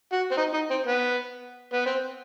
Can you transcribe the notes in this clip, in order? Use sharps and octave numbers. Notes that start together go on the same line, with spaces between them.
F#4
C4
D#4
D#4
C4
B3
B3
C4